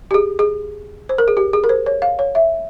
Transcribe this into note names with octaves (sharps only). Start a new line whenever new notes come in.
G4
G#4
G#4
C5
A#4
G#4
G4
G#4
A#4
C5
C#5
F5
C#5
E5